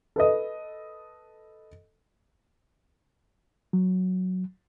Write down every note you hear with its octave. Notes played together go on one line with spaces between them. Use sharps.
A4 B4 D#5
F#3